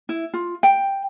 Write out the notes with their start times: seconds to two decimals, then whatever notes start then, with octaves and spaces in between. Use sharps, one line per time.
0.09 E4
0.34 F4
0.63 G5